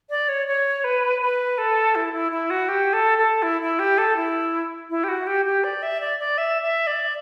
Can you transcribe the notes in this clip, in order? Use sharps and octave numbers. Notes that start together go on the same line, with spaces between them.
D5
C#5
C#5
B4
B4
A4
E4
E4
E4
F#4
G4
A4
A4
E4
E4
G4
A4
E4
E4
G4
F#4
G4
G4
D5
E5
D5
D5
E5
E5
D5